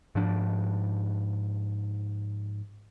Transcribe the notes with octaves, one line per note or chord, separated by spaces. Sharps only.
G#2 F3 D4